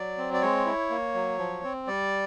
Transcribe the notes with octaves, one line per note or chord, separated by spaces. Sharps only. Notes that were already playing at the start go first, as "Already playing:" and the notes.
Already playing: F#3 D5
C4
D5
G#3 C#5
E4
A#3
F#3
F3
C4
G3 D5